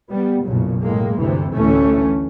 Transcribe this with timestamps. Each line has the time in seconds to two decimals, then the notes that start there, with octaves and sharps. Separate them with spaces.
0.11 G3 B3
0.44 F#1 B1 A#2 C#3
0.80 A2 G#3 A#3
1.18 D2 G2 C3 E3
1.53 A1 D2 E3 A3 C#4